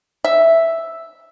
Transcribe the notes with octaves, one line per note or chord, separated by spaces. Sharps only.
E5